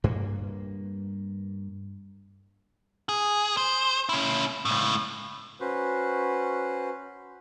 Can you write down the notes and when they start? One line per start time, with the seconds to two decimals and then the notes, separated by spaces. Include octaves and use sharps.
0.04 G2 A#3
3.09 G#4
3.57 C5
4.09 C#4 E4
4.65 C#2 A2
5.60 C#4 F#4 B4 C5